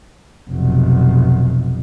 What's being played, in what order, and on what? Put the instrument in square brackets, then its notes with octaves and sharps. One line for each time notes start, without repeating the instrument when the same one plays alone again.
[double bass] F1 B1